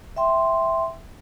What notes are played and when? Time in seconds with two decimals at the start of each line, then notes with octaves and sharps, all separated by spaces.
0.16 E5 G5 C6